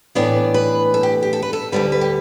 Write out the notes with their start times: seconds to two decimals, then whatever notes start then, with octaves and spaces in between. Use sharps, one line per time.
0.15 A2 E3 B3 D4 D5
0.54 B4
0.94 A4
1.03 G4
1.23 G4
1.33 A4
1.42 B4
1.53 A4
1.72 D2 D3 G3 B4
1.92 B4
2.01 G4